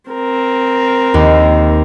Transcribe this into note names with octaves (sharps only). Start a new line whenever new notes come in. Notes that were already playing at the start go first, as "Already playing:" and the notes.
C4 A#4
D#2